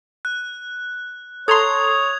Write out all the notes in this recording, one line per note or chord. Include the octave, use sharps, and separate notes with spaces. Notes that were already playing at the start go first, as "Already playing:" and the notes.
F#6
A4 C#5 A#5 C6 D#6 G#6 F7